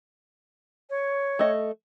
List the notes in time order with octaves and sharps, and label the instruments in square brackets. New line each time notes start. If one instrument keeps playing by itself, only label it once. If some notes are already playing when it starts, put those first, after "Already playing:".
[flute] C#5
[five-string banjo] A3 D#5